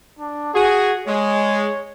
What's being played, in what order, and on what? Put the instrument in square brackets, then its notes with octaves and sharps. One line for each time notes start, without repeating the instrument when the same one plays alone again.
[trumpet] D4
[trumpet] F#4 [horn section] G#4
[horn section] G#3 [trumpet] C#5